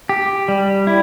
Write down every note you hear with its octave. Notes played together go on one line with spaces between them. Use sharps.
G4
G3
E4